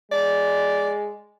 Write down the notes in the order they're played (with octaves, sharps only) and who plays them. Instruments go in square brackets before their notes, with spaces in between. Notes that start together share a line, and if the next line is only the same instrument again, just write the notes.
[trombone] G#3 [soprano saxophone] D5